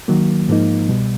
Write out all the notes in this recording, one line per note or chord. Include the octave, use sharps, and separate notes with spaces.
D#3 F#3 A#3
G#2 F3 A#3 D#4
C2 B2 G3